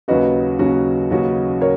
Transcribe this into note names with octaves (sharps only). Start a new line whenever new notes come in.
D#2 C#3 F#3 C#4 F#4 B4 D#5
D#2 C#3 F#3 C#4 F#4
D#2 C#3 F#3 C#4 F#4
A#4 C#5